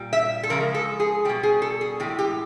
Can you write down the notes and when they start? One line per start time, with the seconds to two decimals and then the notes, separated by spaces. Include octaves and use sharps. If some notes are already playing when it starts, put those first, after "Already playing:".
Already playing: A#2 G3
0.13 E5
0.43 A4
0.50 C#3 F3 G#3 A#4
0.75 A4
1.00 G#4
1.25 G3 G4
1.29 B2
1.43 G#4
1.62 A4
1.81 G#4
2.00 A2 E3 G#3 G4
2.19 G4